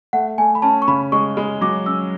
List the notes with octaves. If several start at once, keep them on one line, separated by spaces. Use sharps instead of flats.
A3 F#5
A3 G#5
B5
C#4 A5
C#6
C#3 B5
G#3 C#6
G#3 B5
F#3 D6
C#4 E6